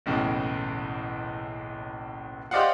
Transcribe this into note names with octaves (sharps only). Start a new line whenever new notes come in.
F#1 B1 A2 C#3 E3
G4 C5 D5 D#5 F5 F#5